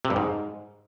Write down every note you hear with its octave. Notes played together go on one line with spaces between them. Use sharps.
C3
G2
G#2